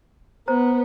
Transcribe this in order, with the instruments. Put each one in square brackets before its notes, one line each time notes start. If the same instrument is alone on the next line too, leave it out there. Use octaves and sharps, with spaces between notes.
[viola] B3 [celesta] C5 A#5